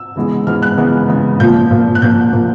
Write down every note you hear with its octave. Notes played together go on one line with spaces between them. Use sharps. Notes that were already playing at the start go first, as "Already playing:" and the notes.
Already playing: E6
C#3 E3 G#3 B3
C#3 E3 G#3 B3 F6
F#6
C#3 E3 G#3 B3
C#3 E3 G#3 B3
A#2 F3 A#3 G6
A#2 F3 A#3
F#6
A#2 F3 A#3 G6
A#2 F3 A#3